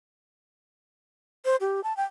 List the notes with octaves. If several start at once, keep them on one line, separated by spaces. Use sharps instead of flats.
C5
G4
A5
G5